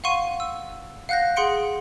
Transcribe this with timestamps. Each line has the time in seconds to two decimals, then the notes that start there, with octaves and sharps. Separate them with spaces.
0.04 F5 F#5 C6 C#6 D#7
0.40 E6
1.09 F5 F#5 F#6 G6 A#6
1.36 G#4 F#5 C6 C#7 D7